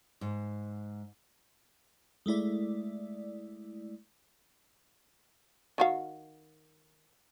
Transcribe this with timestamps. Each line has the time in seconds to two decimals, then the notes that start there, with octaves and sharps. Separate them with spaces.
0.21 G#2
2.26 G#3 A3 E4 D5
5.78 D#3 F#4 F5